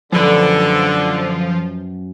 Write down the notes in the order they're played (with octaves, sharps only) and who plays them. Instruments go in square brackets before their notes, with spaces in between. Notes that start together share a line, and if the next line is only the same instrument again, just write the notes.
[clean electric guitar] F#2 B4 [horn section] D3 [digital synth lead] F3